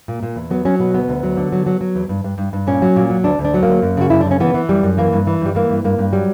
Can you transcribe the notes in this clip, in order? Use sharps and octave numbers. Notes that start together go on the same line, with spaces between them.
A#2
A#2
E2
F#3 B3
F#3 C#4
B2 B3
D2 B3
D2
F#3
D3
F#3
F#3
F#3
E2
G2
G2
G2
G2
A#2 C#4
F#3
A#2
F#3
D2 D4
D2
D4
F#3
D2 A#3
F#2
C#3 F#4
F#2 E4
D4
C#3
C#4
E3 B3
E3
F#2 G3
F#2
E3 A#3
G2
E3
G2 G3
E3 A#3
G2
G2 A#3
G2
F#3 G3